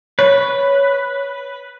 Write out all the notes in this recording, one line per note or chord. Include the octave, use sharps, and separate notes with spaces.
B4 C#5